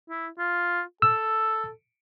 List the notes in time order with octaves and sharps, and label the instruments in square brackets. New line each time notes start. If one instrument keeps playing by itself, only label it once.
[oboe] E4
F4
[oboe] A4 [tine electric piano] E6